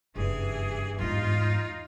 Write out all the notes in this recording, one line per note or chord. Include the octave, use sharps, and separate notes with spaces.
F#1 G2 E3 G#4
E2 G#2 D#4 F4